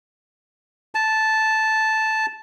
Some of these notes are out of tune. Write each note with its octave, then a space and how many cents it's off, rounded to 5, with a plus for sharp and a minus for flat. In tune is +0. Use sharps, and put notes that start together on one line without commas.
A5 -5